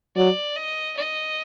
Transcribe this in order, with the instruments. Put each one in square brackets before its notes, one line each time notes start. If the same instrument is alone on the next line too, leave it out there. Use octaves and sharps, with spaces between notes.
[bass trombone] F#3 [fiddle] D5
[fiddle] D#5
D#5